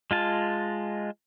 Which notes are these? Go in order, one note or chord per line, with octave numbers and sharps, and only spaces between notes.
G#3 F4 A5